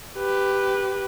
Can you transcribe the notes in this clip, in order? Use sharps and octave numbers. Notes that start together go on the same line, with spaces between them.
G4 B4